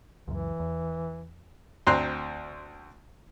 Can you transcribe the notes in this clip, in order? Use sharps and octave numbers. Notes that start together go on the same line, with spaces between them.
C#2 F#2 E3
E2
D2 C4 A#5 C6 F#6